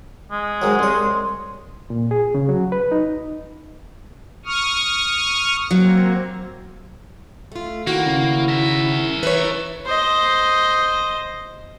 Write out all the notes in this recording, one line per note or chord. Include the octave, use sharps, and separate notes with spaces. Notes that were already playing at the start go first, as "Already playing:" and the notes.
G#3
G#2 D#3 F#3
C2 C#5 C6
A#2
G#4
C#3
F#3
B4
D#4
C#6 D#6 F6
F#3 A#3 C4
A3 F4
D#3 A#3 E4 F#4
C#3
A#4 E5
E3 B4 C#5
C5 D#5